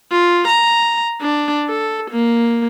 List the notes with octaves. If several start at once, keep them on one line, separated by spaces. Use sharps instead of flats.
F4
A#5
D4
A4
A#3